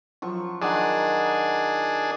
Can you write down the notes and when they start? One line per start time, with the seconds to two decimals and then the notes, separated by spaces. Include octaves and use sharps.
0.22 F3 F#3 C#6
0.62 D#3 D4 G#4 F#5 A#5